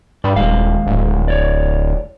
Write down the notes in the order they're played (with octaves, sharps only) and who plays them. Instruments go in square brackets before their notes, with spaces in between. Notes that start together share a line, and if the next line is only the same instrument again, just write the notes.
[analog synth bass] G2 [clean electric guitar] D5 B5
[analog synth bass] D#1 [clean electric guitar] D#2 G#3 F5
[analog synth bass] D1
[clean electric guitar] C#5 D5